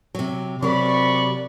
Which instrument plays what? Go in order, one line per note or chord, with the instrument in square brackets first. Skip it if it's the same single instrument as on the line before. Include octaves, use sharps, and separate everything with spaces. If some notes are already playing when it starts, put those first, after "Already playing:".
[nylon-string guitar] C3 F#3
[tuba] C3 [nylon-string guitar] F#3 A#4 [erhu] D5 [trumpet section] B5 C#6